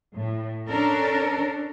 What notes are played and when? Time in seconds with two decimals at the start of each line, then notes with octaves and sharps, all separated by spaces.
0.14 A2
0.68 C#4 D4 A4 A#4